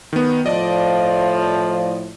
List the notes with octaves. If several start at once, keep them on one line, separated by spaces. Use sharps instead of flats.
D#3 B3
A2 F3 D5 D#5